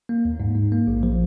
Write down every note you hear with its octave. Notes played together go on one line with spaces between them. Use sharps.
A#3
D#2
G#2
G#2
A#3
A#1
F3